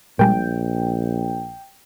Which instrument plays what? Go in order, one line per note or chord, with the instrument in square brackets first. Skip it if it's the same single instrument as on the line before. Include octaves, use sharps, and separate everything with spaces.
[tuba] A#1 [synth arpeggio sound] A#2 G3 G#3 [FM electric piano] G5